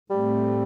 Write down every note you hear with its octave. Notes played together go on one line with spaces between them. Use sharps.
A2 G3 A3 C4